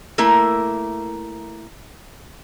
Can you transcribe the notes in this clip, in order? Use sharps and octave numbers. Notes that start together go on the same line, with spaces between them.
A3 A#3 E4 A#4